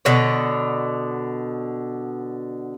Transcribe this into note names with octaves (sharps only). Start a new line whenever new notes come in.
B2 D3 C#5